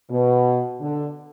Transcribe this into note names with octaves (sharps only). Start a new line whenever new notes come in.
B2
D3